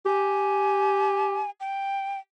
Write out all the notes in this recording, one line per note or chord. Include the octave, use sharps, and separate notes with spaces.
G4 G#5
G5